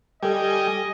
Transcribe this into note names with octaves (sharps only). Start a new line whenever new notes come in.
G3 G4 A4 D#5 G#5